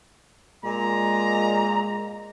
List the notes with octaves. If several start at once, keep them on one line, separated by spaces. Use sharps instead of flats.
A#2 G#3 A#5